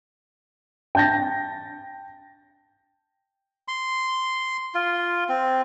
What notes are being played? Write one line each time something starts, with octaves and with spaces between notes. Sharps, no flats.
G5 A5 G6 A6 A#6
C6
F4
C4